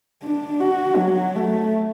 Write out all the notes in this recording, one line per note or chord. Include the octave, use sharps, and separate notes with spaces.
D4
F#4
F#3
A3